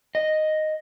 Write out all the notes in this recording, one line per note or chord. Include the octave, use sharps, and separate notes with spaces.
D#5